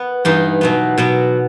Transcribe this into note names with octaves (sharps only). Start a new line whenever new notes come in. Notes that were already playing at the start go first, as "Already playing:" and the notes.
Already playing: B3
G2 E3 B3 D#4
B2 F#3 B3
B2 F#3 B3